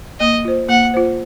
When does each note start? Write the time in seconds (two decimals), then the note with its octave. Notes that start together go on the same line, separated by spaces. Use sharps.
0.20 A#3 D#5
0.45 F4 C5
0.69 A#3 F#5
0.94 F4 C5